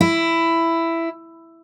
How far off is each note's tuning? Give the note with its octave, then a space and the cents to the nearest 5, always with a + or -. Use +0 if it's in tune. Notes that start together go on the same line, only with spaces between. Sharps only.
E4 +10